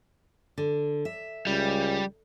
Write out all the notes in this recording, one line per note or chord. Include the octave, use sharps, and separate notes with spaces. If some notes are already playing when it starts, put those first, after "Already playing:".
D3
E5
C#2 G3